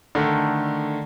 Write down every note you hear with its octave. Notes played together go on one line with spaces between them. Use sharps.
D3 D#3 A3 D4